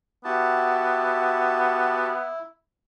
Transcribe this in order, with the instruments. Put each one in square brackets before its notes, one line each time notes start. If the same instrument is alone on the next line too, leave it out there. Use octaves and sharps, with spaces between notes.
[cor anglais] B3 [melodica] E4 [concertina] F#4 G4 A5